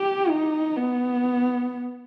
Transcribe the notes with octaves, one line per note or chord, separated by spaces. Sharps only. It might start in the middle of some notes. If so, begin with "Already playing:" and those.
Already playing: G4
D#4
B3